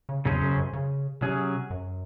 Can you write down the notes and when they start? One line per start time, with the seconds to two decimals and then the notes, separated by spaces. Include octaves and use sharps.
0.09 C#3
0.25 E2 C#3 F#3 C#4 G#4 C5
0.41 F#2
0.57 F#2
0.73 C#3
1.21 C3 F#3 C#4 G#4
1.70 F#2